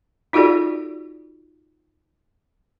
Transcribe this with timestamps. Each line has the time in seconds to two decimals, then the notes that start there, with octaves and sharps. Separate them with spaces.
0.33 D#4 F4 F#4 G#4 A4 D5